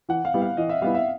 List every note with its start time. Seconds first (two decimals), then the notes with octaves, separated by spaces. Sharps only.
0.09 E3 F#5
0.25 F5
0.34 G3 B3 E4
0.42 F5
0.57 E3 D#5
0.69 E5
0.82 G3 B3 E4 F5
0.95 E5